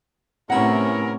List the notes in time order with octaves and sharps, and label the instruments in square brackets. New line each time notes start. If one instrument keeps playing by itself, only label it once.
[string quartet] A2 C3 [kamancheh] B3 C#4 [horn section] E4 A#4 [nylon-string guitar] F#5